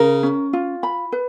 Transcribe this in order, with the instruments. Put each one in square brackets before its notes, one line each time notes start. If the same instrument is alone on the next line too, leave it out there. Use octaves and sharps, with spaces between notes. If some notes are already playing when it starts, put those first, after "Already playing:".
Already playing: [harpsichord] C#3 [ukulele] A#4
[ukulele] C#4
F4
B5
B4